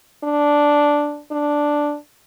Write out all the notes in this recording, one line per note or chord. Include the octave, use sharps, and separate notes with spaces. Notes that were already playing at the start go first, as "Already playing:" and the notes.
D4
D4